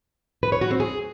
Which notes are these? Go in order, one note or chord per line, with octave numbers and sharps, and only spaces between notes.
B4
C#5
F#4
C4
G#4